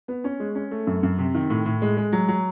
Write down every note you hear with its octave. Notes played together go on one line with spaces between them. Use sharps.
B3
C#4
G#3
C#4
A3
F#2
F#2
C3
D#3
A2
A2
G#3
G#3
F#3
F#3